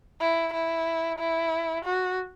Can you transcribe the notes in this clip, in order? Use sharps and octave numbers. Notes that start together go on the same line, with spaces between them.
E4
E4
E4
F#4